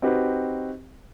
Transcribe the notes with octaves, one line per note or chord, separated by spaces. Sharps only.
C4 D#4 F#4 G4 B4